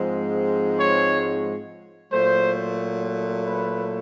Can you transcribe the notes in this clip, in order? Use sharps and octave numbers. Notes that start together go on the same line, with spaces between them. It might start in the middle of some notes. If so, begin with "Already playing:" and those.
Already playing: G#2 F3 G#3 C4
C#5
A#2 F#3 A3 C5
B4